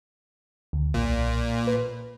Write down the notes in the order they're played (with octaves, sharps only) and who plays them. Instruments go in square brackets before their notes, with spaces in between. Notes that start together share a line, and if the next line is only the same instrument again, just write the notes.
[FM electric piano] D2
[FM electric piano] B1 [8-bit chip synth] A#2
[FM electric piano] B4